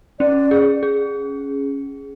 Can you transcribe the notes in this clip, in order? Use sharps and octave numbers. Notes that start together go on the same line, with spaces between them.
C#4 D5
G#4
G#4